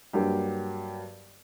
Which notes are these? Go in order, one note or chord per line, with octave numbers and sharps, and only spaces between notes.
G2 F#3 A#3 G4